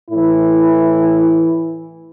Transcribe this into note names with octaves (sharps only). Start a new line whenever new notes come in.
A2 E3 E4